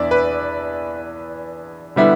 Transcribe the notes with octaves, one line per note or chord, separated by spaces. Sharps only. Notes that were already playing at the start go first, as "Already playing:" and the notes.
Already playing: E2 B3 D4 D5 E5
B4
D3 G3 B3 E4